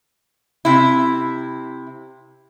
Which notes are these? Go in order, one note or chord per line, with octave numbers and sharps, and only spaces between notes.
C3 E4